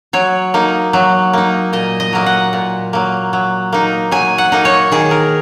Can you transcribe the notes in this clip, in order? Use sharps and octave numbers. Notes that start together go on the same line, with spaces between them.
F#3 C#5
A#3 D#4
F#3
A#3 D#4
A#2 D#5
D#5
F#3 A#3 D#5
F#5
A#2
F#3 A#3
F#3
A#3 D#4
F#3 G#5
F#5
A#3 D#4
C#5
D#3 G#4
A#4